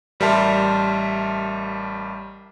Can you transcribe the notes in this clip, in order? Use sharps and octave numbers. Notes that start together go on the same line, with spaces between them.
A1 G3 A#4 E5 A5 C6